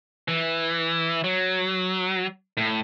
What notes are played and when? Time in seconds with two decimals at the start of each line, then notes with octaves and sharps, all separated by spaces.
0.28 E3
1.24 F#3
2.57 A2